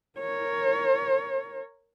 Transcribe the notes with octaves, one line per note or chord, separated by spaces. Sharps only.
A#4 C#5